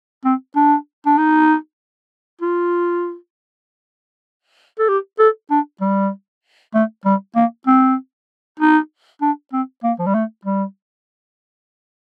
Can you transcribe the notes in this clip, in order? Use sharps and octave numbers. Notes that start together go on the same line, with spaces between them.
C4
D4
D4
D#4
F4
A4
G4
A4
D4
G3
A3
G3
A#3
C4
D#4
D4
C4
A#3
F3
G3
A3
G3